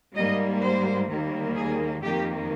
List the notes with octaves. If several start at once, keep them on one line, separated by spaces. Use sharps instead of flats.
G#2 G3 A#3 D#5
C5
D#2 D#3 G3 A#3
G#4
F2 D#3 A#3 G4